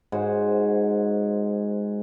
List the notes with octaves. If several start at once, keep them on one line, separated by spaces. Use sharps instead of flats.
G#2 F#4 C5 C#5